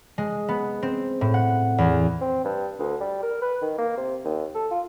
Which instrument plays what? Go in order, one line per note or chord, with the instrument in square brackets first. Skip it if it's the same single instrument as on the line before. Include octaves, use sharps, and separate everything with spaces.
[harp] G#3
B3
C4
A2
F#5
E2
[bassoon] C4
G2
D2
G3
A#4
B4
D#3
A#3
C3
D#2
A4
F4